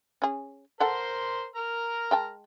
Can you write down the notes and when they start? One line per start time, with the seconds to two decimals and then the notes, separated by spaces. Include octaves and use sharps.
0.22 C#4 G#4
0.80 A4 A#4 C5 F#5 A5 C6
1.56 A#4 A#5 F6
2.11 G#3 G5 A5